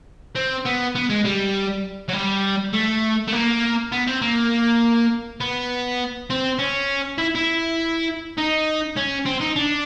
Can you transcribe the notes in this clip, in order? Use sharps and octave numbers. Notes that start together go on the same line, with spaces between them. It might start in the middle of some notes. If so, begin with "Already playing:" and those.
C4
B3
B3
G#3
G3
F#3
G3
A3
A3
A#3
B3
C4
A#3
B3
C4
C#4
E4
E4
D#4
C#4
C4
D#4
D4